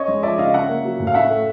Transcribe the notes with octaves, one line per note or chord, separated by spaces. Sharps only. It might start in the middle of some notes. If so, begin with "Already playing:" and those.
Already playing: C#4 C#5 D#5
G#3
F3 D5 E5
C#3 D#5 F5
C#4 E5 F#5
A#3
F#3
A2
F5
C#4 E5 F#5
A3